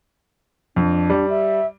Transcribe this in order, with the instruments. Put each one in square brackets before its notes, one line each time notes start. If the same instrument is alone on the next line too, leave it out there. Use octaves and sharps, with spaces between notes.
[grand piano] F2 [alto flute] D4
[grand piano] G3
[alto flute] E5